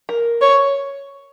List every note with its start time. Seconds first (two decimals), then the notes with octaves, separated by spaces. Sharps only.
0.09 A#4
0.41 C#5